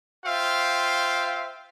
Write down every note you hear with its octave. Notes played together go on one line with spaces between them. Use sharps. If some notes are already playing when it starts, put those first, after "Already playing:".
F4 C5 E5 F5 G5